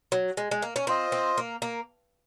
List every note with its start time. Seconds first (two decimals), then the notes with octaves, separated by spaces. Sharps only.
0.12 F#3
0.37 G#3
0.51 G#3
0.62 A#3
0.76 C#4
0.87 C4 F4 C5 D#5
1.12 C4
1.38 A#3
1.62 A#3